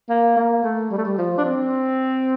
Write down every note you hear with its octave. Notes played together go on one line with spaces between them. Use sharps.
A#3
A#3
A3
G3
A3
G3
F3
D4
C4